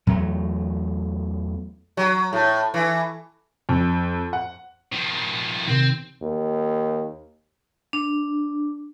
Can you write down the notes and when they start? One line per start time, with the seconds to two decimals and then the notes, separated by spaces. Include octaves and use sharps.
0.07 E2 F#3 A3
1.97 F#3
2.33 A2
2.74 E3
3.69 F2
4.33 F#5
4.92 D#3 F3
5.68 C3 D#3 C4
6.22 D#2
7.93 D4